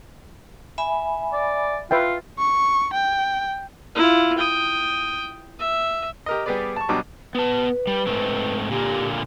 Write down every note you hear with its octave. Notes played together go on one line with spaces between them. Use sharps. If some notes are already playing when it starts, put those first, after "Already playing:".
E5 G#5 B5
D5
F4 B4 E5 G5
C#6
G5
E4 F4
G5 D#6
E5
G4 A#4 D#5
G3 B3 G4 G#4 B4 D5
A5 C#6
B2 F#3 G3 D4 D6
B3 B4 A5
G3
G#2 A3 C4
A#2 D3 A#3 G4